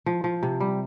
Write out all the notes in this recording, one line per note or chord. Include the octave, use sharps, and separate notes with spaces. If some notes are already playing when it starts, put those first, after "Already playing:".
F3
F3
C3
G3